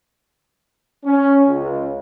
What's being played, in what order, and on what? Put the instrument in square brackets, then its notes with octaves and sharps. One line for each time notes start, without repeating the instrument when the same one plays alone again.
[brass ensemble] C#4
C#2